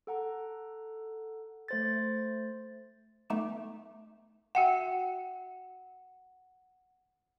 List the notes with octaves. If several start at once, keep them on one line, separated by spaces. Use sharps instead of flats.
A4 F#5 A#5
A3 C5 A6
A3 B3 D#4 D6 E7
F#4 E5 F#5 G5